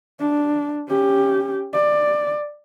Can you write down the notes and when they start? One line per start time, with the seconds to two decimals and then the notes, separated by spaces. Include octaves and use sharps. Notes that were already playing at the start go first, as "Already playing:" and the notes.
0.19 D4
0.89 C#4 G4
1.73 D5